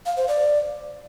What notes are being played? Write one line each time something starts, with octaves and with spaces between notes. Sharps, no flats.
F5
C5
D5